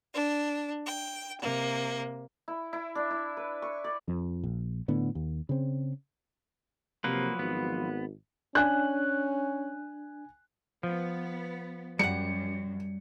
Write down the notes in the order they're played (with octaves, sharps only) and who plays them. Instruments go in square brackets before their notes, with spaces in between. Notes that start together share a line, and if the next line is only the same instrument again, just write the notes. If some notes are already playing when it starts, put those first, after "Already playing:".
[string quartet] D4
G5
C3 A#3
[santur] E4
E4
D4
E4
B4
C#6
D5
[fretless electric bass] F2
A#1
A2 D3 B3
D#2
C#3 C4
[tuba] C3 [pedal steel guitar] F3 F#3 B4 [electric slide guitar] A#3
[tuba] G#1 [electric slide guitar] B3
[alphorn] C#4 [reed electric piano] D4 [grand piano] G#5 F#6
[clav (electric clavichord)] F3 [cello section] B3
[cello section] F#2 [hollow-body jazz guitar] G3 F#5 [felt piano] C#7